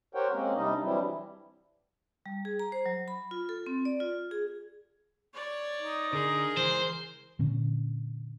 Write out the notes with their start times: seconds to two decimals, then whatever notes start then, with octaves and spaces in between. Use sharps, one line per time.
0.15 G4 A#4 C5 C#5 F#5 G5
0.33 G#3 A#3 C4 C#4
0.56 C3 G3 D4 D#4 D#5
0.82 E3 F#3 G3 C4 D4 E4
2.26 G3
2.45 G#4
2.59 A#5
2.72 C5
2.86 F#3
3.08 B5
3.31 F4
3.49 A4
3.66 C4
3.85 D5
4.00 F4
4.31 G#4
5.34 C#5 D5
5.82 D#4
6.13 D3 G#4 A#4
6.57 C#2 G#2 E3 C5
7.39 A#2 D3 C#4